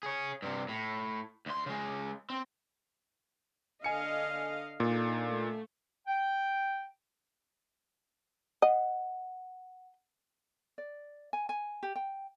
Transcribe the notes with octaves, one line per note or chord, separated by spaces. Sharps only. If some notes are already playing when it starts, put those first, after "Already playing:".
G#4 C#5
G2 C3
A2
D2 C6
C#3 G#3
C4
D3 D#5 F5 G#5 C#7
A#2 D4 D#4 A4
A3
G5
D#5 F#5
D5
G#5
G#5
G4
G5